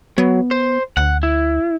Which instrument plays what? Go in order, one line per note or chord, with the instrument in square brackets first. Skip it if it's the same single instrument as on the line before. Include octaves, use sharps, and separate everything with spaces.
[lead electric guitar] F#3 [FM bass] B3
[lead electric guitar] C5
[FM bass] D2 [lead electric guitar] F#5
[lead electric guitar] E4